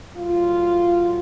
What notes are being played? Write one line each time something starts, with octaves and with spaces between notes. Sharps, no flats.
A2 F#3 F4